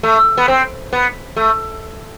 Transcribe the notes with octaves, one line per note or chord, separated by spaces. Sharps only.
A3
B3
C4
B3
A3